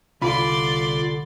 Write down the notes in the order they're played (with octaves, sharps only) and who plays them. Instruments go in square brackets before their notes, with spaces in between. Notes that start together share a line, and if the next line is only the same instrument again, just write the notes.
[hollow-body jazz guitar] C2 F4 [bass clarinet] D3 [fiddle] D5 C6 [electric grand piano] B5